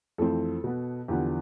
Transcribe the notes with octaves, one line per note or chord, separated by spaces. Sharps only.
F2 E3 A3 C4 A4
B2 B3
E2 D3 F3 B3 G4